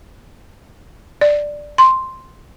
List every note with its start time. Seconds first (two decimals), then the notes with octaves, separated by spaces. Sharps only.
1.21 D5
1.78 C6